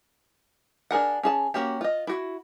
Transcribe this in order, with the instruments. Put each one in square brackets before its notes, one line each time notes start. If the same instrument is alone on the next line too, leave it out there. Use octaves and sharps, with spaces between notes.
[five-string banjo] D4 G#4 A#4 F#5
C#4 G#4 A5
A#3 C#4 F#4 G4
F4 D#5
E4 F#4